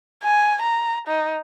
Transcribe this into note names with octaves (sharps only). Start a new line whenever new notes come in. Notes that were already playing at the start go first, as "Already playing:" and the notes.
G#5
A#5
D#4